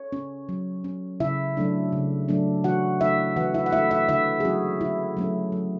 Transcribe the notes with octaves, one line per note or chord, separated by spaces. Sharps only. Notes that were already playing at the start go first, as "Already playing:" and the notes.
Already playing: C#5
C#4
F#3
C#4
C#3 E4 E5
F#3 A3 D4
C#3
F#3 A3 D4
E3 F#4 F#5
A3 D4 E4 E5
E3 F#4 F#5
E4 E5
F#5
A3 D4 E4 E5
E4 E5
D3 E4 E5
G#4
F#3 A3 C#4 F#4
D3 E4
F#3 A3 C#4
F#3